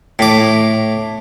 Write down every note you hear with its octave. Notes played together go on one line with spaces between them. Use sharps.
A2 D6